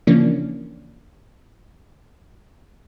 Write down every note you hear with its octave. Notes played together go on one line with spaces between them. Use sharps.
C#3 E3 F3 A#3 C#4 D4